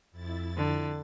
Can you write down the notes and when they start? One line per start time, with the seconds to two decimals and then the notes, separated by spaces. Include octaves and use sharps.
0.12 F2 E4 A6
0.57 D3